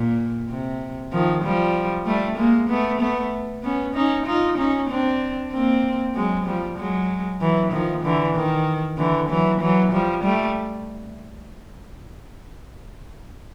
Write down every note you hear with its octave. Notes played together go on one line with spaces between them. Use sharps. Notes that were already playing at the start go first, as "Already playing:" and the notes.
Already playing: A#2
C3
D#3 F3
F3 G3
G3 A3
G#3 A#3
A3 B3
A3 B3
B3 C#4
C#4 D#4
D#4 F4
C#4 D#4
C4 D4
A#3 C4
F#3 G#3
F3 G3
F#3 G#3
E3 F#3
D#3 F3
D3 E3
D#3
D3 E3
E3 F#3
E3 F#3
F3 G3
G3 A3